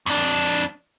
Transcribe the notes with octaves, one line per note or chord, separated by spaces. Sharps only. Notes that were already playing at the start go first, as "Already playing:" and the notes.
F2 D4